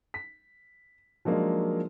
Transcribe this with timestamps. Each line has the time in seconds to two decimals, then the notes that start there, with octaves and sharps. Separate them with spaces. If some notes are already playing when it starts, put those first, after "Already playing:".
0.14 B6
1.25 F3 F#3 G#3 A#3 D4 D#4